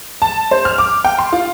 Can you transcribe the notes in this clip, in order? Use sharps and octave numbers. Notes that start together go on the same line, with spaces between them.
A5
C5
F6
D6
G5
C6
F4